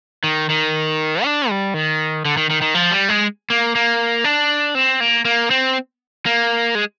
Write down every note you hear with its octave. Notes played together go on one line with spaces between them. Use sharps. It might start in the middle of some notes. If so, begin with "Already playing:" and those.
D#3
D#3
D4
G3
D#3
D3
D#3
D#3
D#3
F3
G3
G#3
A#3
A#3
D4
C4
A#3
A#3
C4
A#3
G#3